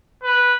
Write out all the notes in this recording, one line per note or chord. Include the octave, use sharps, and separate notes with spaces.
B4